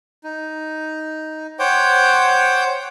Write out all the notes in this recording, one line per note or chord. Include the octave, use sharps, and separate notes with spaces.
D#4
C5 C#5 F#5 G5 D6 G6